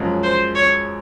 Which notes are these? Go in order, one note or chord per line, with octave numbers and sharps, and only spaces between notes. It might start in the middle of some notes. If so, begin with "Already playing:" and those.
Already playing: F#2 F3 G#3 C#4
C5
C#5